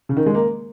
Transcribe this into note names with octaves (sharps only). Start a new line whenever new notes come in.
C#3
D#3
G#3
A#3